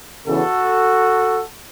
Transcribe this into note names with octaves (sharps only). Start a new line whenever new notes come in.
E2 C#3 E3 F#4 A4